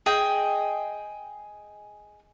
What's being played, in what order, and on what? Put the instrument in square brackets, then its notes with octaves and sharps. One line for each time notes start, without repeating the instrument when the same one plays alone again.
[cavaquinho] G#4 D#5 G5